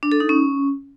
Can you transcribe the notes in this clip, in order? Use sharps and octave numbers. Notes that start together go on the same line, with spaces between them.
D4
A4
D#4
C#4